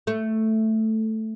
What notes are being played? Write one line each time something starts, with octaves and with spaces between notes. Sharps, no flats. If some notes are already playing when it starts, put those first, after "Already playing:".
A3